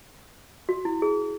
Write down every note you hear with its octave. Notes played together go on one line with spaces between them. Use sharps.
F#4
E4
G#4